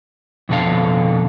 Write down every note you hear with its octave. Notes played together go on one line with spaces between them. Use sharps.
F2 B2 D3 A4 F5